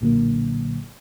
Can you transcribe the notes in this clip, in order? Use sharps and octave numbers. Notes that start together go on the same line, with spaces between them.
B1 A#2 D3 F#3 A#3